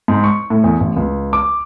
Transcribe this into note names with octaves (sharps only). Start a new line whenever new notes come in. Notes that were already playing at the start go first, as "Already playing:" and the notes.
G#2
C#6
A2
E2
A1
C#2
D6